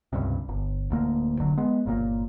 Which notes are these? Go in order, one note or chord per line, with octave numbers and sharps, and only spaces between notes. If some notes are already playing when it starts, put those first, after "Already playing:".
C#2 G2 C3
G1
D1 D2 A#3
F1 D3 F#3
G#3 B3
G1 A#2 D3 A#3